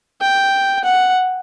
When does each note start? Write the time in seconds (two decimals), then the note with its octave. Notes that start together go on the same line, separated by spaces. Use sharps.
0.22 G5
0.84 F#5